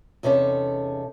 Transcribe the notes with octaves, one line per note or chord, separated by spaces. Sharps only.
E2 C3 C#4 D#4 G#4 A4